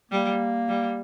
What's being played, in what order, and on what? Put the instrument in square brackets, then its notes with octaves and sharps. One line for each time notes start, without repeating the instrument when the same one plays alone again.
[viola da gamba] G3 [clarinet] A#3
[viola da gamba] G3